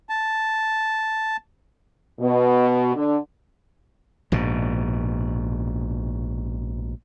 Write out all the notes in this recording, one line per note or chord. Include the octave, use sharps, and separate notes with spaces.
A5
B2
D3
A#1 G#2 B2